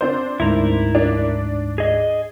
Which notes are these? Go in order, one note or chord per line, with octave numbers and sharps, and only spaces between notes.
C4 D4 C5
D2 G#2 E4 A#4
D4
G#4 D#5